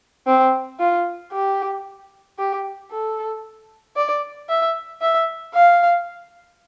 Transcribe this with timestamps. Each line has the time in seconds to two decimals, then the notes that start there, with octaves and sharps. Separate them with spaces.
0.27 C4
0.79 F4
1.32 G4
2.39 G4
2.91 A4
3.96 D5
4.49 E5
5.01 E5
5.55 F5